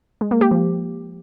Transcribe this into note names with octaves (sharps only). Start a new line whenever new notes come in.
G#3
A#3
G4
F3